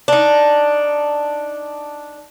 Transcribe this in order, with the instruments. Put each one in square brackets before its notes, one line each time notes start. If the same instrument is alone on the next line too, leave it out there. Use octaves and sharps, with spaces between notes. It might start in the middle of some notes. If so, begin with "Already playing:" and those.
[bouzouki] D4 D#4